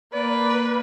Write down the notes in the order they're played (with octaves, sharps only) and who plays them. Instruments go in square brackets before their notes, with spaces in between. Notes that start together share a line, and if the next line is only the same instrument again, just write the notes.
[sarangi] A#3 [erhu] B4 [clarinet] D5